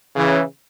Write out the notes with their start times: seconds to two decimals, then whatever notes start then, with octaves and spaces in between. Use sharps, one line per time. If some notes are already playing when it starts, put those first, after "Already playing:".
0.16 C#3 E3